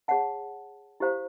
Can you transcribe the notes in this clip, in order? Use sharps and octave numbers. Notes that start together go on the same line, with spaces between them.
G#4 C#5 F#5 A5
E4 G4 C5 F5 A#5